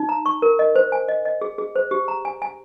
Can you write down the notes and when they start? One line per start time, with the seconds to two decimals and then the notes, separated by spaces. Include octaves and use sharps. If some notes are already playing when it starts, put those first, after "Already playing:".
Already playing: D#4
0.09 A#5
0.26 C#6
0.42 A#4
0.59 D#5
0.76 C5
0.92 G#5
1.08 D#5
1.25 D#5
1.41 G#4
1.58 G#4
1.76 C5
1.91 G4
2.08 A#5
2.25 G#5
2.42 G#5